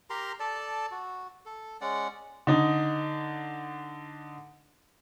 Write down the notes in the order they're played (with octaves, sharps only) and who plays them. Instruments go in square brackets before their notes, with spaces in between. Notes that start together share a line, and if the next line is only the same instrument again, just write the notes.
[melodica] G4 A#4 A#5 C6
A4 D5 A5
F#4
A4
G#3 C#4 D5 F#5
[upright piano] D3 D#4